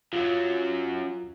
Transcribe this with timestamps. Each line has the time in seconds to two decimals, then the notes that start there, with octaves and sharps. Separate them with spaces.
0.13 F#2 F#3 F4